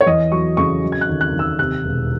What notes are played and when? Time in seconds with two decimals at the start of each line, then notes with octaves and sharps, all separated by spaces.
0.01 C#5
0.06 E2 D#5
0.32 F#3 C#6
0.57 C#3 C#6
0.82 F#3
0.92 G#6
1.01 F#6
1.09 D#2
1.21 F#6
1.34 D#2
1.39 E6
1.59 C3 F#6
1.84 E1